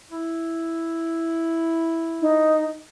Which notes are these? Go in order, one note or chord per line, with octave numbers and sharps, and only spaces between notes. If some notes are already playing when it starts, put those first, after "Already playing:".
E4
D#4